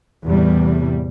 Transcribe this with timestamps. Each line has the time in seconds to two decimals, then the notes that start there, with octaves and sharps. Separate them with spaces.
0.23 E2 A2 C3 G3